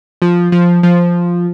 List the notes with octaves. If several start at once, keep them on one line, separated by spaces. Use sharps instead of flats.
F3
F3
F3